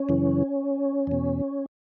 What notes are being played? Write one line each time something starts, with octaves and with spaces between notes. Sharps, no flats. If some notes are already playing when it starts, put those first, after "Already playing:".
Already playing: C#4
F#2 C#3 E3
E2 B2